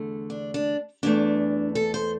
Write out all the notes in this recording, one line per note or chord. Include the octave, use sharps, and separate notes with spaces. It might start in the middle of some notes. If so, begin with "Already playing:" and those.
Already playing: E2 D3 A3
D4
D4
E2 E3 A3 D4
A4
C5